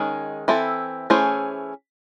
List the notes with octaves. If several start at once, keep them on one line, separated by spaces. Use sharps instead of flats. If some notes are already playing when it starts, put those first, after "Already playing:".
Already playing: D#3 G#3 C#4 G#4
E3 C4 E4 A4
E3 A3 C#4 G#4 C5